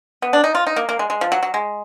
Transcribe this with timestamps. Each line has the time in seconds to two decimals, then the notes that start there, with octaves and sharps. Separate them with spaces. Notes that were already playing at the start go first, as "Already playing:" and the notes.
0.22 B3
0.33 D4
0.44 D#4
0.55 F4
0.67 D#4
0.76 A#3
0.89 A#3
0.99 G#3
1.10 G#3
1.21 F3
1.32 F#3
1.43 F#3
1.54 G#3